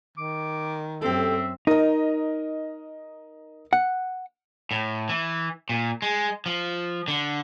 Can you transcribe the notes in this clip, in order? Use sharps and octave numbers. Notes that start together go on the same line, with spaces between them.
D#3 D6
F#2 C4 G4 A4 E5
D#4 A#4 D#5
F#5
A2
E3
A#2
G#3
F3
D3